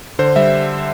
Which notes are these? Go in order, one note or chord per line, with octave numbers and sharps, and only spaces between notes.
D3 C5
G3 E5